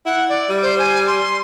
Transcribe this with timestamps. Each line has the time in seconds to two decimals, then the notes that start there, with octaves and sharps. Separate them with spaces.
0.06 E4 F#5
0.29 D5
0.49 G3
0.62 C5
0.79 G#5
1.07 C6